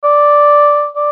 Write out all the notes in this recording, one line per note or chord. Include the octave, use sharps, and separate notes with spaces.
D5
D5